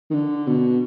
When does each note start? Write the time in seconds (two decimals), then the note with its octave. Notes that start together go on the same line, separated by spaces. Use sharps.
0.11 D#3
0.14 D3
0.47 B2